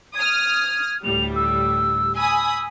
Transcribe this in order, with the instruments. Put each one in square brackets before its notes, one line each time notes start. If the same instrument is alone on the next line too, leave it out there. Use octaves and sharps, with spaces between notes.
[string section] D#6 F6 [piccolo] G#6
[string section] D2 A2 G3 [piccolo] F7
[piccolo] E6
[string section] G#5 B5 D#6 [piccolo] E6